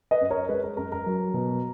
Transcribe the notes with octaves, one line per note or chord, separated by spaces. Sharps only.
B4 D#5
F#2
A#4 C#5
G#3 B4
A#4
F#2 A#4
A#4
F#3
B2